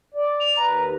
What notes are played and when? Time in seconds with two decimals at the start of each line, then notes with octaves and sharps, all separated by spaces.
0.14 D5
0.40 F7
0.57 D#2 B4 A#5